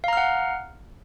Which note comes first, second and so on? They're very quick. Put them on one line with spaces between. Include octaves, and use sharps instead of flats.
F5 A#5 F6 F#5